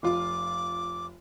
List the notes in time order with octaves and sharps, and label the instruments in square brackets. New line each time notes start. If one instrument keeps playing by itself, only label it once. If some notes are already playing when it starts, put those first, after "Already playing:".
[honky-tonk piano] F1 F4 [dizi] D6